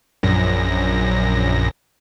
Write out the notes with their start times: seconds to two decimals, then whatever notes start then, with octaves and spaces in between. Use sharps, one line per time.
0.23 A#1 F#2 A#6